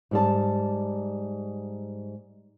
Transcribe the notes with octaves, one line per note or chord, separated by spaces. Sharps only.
G#2 G3 A5